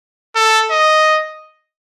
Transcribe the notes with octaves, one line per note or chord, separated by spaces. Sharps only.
A4
D#5